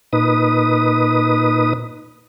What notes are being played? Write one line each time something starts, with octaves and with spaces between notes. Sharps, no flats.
A#2 D#4 B4 D#6